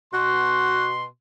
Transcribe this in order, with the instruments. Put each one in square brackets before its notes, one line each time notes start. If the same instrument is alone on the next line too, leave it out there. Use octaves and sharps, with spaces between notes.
[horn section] B2 C6 [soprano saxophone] F#4